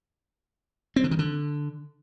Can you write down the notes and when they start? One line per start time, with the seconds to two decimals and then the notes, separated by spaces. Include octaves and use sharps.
0.96 C4
1.04 D3
1.11 D#3
1.19 D3